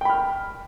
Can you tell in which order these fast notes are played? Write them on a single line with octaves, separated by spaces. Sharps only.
G5 B5 F6